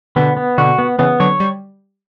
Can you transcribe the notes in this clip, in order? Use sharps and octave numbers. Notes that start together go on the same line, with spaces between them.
B2 D3 B3
B3
B2 D3 F#4
B3
C#3 E3 B3
D3 F#3 C#5
G3